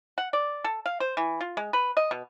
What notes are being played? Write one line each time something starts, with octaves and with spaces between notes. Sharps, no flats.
F#5
D5
A4
F5
C5
E3
F4
G#3
B4
D#5
B2